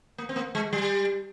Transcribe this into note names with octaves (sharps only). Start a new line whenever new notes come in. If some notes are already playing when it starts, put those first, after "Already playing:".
A#3
C4
A#3
G#3
G3